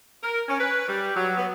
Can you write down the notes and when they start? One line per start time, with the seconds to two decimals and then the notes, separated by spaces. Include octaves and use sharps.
0.23 A#4
0.48 C#4
0.60 B4
0.88 G3
1.16 F#3
1.37 B3